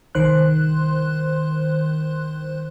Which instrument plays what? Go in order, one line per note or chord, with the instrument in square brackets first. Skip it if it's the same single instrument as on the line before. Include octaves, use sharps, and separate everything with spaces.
[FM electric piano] C2 D#3 C5 C6 F#6